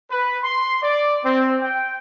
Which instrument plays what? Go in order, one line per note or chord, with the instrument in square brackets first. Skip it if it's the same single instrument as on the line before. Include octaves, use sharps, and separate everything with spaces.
[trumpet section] B4
C6
D5
C4
G5